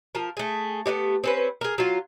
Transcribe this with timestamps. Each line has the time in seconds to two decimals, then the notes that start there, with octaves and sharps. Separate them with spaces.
0.15 F3 A#4
0.37 A3 G#4
0.86 A3 B3 D#4 G4
1.24 C4 C#4 B4
1.61 G#4 A#4
1.78 F#3 F4